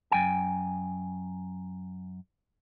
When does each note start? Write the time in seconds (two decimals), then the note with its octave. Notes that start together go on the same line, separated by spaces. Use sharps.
0.12 F#2 G5 G#5